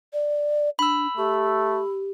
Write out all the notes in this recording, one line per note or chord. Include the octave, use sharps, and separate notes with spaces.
D5
D4 B5 E6
A3 G4